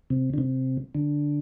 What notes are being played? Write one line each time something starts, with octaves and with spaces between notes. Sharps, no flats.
C3
D3
C3
D3